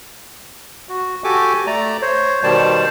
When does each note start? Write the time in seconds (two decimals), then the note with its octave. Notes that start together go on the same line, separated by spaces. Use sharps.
0.89 F#4
1.24 F#4 G4 A4 G#5 D6
1.67 A3 D5 A#5
2.02 C5 C#5
2.44 B2 D#3 G3 C5 D5 A5